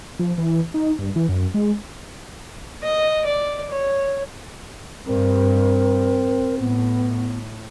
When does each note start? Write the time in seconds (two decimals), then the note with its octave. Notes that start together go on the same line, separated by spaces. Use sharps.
0.19 F3
0.38 E3
0.74 D#4
0.99 G2
1.16 E3
1.29 F#2
1.54 G#3
2.83 D#5
3.25 D5
3.70 C#5
5.07 G2 C4 A#4
6.59 A2 B3